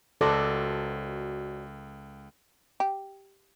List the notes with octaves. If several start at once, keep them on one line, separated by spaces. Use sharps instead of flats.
C#2 F#4 A4 C5 D5
G4